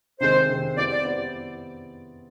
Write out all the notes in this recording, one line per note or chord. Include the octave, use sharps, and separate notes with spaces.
C3 D#3 G#3 C4 C5
C3 D#3 G#3 C4
B3 E4 G4 C5 D5
D5
B3 E4 G4 C5